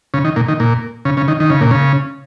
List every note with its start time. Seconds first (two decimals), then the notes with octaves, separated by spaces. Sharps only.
0.14 C#3
0.25 D#3
0.36 A#2
0.48 D#3
0.60 A#2
1.05 C#3
1.17 C#3
1.28 D#3
1.40 D#3
1.50 C#3
1.61 A#2
1.71 C#3